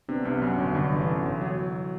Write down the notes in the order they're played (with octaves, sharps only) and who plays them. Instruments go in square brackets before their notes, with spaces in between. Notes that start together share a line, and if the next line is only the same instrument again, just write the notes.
[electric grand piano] C3 [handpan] B3 D4
[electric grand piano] C2 [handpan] B3 D4
[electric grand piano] F#2 [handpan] F#3
[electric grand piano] G1
[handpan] C3
[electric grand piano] G2 [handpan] D3
[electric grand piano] G1 [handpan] E3
[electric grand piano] F#2
G1
F#3